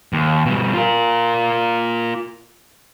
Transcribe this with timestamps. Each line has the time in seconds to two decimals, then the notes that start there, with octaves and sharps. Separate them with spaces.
0.13 D#2
0.45 B2 G3
0.74 F4 A#4